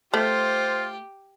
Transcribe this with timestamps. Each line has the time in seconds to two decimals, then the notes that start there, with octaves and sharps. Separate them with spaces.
0.14 A3 F4 G4 C5